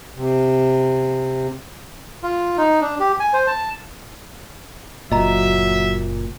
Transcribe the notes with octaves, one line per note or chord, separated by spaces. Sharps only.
C3
F4
D#4
D4
G4
G#5
C5
A5
F#1 A#2 F#3 D#5 E5 A#5